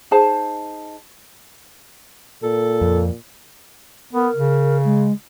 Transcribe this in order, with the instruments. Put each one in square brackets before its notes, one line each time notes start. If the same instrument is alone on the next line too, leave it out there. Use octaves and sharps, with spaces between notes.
[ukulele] D#4 G#4 C5 A5
[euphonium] A#2 [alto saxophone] A4
[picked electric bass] F2
[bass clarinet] B3 [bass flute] A#4
[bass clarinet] C#3
[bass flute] G#3